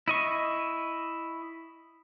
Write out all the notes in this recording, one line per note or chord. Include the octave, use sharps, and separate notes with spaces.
E4 D#5 C#6